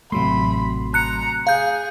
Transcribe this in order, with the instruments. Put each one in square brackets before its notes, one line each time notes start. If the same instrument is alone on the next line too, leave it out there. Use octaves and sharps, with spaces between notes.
[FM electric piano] A1 F#3 C6 [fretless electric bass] C3 A3 [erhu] B5
[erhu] A#5 [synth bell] F#6 C#7
[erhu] G#4 [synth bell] F5 G6